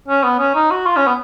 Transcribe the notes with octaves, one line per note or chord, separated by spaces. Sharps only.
C#4
B3
C#4
D#4
F#4
F4
C#4
B3